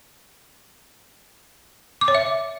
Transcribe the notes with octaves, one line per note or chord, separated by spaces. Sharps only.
D6
C#5
E5